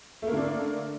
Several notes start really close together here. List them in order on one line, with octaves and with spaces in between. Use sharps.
A3 A#3 D3 D4